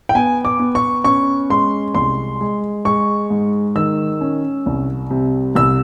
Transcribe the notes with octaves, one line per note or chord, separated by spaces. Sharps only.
G5
B3 G#5
D6
B3
C#6
C#4 C#6
G#3 C6
C2 C6
G#3
G#3 C#6
G#2
D#3 E6
C#4
C2
C3
C2 E6